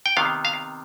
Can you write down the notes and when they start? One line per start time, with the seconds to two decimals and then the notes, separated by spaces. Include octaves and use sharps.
0.06 G5
0.17 C3 D#3 B3 F5
0.45 F5